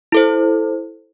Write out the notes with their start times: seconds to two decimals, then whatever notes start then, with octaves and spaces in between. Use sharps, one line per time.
0.12 E4 A4 C5